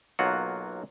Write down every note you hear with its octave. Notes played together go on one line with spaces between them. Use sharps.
B1 F#3 A#3 F4 F#4 F#5